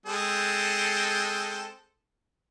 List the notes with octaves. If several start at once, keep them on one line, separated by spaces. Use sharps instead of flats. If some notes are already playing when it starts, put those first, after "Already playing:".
G#3 C4 A4